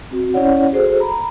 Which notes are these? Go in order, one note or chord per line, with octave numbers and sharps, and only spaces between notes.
C4 F#4
C#4 E4 C#5 D5 F#5
F#4 G#4 A4 C5
A#5 B5